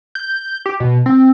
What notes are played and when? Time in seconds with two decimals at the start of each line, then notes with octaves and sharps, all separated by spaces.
0.15 G6
0.66 G4
0.80 B2
1.06 C4